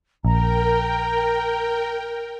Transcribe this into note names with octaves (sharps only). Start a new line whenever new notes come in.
A#1 A#4 G5 A#5